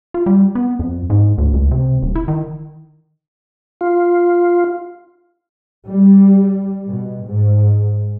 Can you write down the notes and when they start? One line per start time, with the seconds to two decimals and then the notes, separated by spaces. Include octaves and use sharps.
0.14 F4
0.26 G3
0.55 B3
0.79 F2
1.10 G#2
1.38 D2
1.54 C#2
1.71 C3
2.02 D#1
2.15 E4
2.28 D#3
3.81 F4
5.86 G3
6.89 B2
7.25 G#2